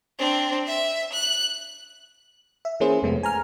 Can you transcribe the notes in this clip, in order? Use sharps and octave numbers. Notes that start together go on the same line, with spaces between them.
C4 D4
E5
F#6
E5
E3 A#3 C#4 E4 G#4 C5
F2 C3 G#3 A3 B3 C4
G#5 A#5 F6